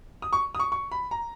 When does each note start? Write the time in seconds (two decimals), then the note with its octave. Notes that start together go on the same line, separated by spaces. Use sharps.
0.22 D#6
0.33 C#6
0.55 D#6
0.59 C#6
0.72 C#6
0.92 B5
1.11 A#5